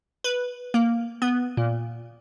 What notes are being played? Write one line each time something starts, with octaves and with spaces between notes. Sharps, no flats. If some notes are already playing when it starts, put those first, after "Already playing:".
B4
A#3
B3
A#2